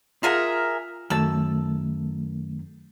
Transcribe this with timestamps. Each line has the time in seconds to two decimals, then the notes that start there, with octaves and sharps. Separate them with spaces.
0.23 F4 G#4 A#4 E5 F#5
1.10 F#2 D#3 A3 A5 E6